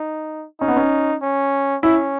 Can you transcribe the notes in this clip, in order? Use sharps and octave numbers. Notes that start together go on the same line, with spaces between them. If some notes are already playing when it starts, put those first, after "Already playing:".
Already playing: D#4
C#4 D#4
B3
C#4
C#4
C#4 E4